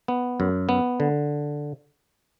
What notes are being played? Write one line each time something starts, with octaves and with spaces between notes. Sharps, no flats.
B3
F#2
B3
D3